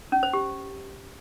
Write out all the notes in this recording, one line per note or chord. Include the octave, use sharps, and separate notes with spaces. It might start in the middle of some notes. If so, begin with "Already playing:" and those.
C#4
C5
G4